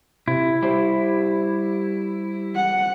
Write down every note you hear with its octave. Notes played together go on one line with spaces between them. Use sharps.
C3 E4
G3 G4 C5
F#5